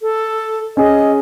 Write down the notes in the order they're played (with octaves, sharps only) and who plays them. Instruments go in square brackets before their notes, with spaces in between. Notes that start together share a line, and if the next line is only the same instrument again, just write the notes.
[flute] A4
[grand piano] C#4 G#4 [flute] D#5